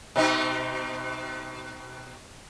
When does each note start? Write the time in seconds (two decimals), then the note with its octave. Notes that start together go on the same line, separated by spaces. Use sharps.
0.16 B2 C4 D#4